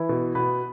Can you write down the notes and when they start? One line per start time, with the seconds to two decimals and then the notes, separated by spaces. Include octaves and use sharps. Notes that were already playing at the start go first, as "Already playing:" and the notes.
Already playing: E3 E4
0.09 B2
0.35 B2 B3 B4